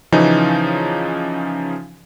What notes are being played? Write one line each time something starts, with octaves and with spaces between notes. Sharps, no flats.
C#3 E3 F3 C#4 D#4